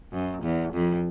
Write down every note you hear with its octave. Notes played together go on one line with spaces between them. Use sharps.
F#2
E2
F2